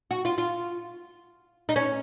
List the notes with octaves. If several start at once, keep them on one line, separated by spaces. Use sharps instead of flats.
F#4
F4
F4
D#4
C#4